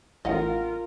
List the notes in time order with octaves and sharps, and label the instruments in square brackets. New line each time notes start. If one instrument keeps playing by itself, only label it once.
[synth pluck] A1 [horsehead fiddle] F4 A#4 [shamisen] D#5 F5 F#5